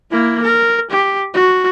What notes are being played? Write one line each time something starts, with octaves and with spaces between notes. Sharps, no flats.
A#3 E4
A#4
G4
F#4